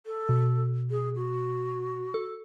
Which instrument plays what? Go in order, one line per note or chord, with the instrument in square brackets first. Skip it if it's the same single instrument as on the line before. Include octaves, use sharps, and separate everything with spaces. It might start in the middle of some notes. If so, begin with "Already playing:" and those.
[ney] A4
[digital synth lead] B2
[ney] G#4
F#4
[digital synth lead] A4